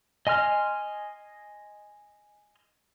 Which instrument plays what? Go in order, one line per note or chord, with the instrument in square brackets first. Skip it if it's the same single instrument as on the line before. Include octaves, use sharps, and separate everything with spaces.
[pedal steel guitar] D#5 G#5 C6 F6